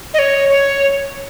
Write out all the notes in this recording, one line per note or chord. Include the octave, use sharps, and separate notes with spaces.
D#5
C#5
C#5